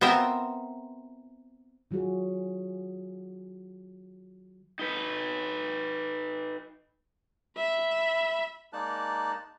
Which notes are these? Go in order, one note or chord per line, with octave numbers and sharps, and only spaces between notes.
B3 C4 F4 A#4 C5 E5
D#3 F#3 F4 F#4 G#4
D#4 B4
E5 B5
G#3 A#3 D#4 D5 A5 F#6